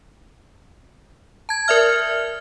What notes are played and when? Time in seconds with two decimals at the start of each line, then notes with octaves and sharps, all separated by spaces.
1.49 A5 G#6
1.68 A#4 D5 E5 F6